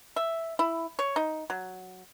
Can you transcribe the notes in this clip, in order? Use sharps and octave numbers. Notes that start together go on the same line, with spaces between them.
E5
E4
C#5
D#4
F#3